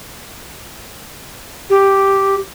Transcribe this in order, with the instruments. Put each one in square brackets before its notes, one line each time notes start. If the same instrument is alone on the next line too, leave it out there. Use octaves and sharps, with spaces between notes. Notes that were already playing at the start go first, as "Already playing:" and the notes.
[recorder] G4